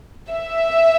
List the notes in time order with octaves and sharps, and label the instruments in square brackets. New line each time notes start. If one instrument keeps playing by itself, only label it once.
[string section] E5